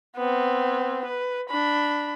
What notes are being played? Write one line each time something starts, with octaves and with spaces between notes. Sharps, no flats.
B3 C4
B4
D4 B5